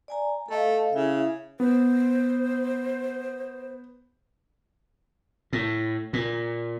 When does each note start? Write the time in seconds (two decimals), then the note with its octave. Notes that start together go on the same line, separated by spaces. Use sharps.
0.08 D5 G#5 A#5
0.48 A3 A4 D#5 F5
0.93 C#3 E4 E5
1.60 B3 C5
5.53 A2
6.13 A#2